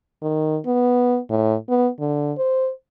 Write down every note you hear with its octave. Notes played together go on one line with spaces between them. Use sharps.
D#3
B3
A2
B3
D3
C5